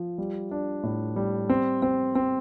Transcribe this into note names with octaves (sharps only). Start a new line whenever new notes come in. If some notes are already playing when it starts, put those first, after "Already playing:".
Already playing: F3
G3
D4
A2
G3
C4
C4
C4